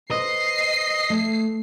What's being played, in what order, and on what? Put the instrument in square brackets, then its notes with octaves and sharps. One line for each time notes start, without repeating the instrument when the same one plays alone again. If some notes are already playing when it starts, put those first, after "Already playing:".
[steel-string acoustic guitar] B4 C5 [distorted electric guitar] D#5 [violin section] C7
[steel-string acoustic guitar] A3